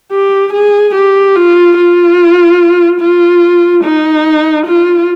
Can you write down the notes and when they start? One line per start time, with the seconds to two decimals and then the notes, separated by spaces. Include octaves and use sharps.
0.12 G4
0.53 G#4
0.95 G4
1.35 F4
1.77 F4
3.01 F4
3.84 D#4
4.66 F4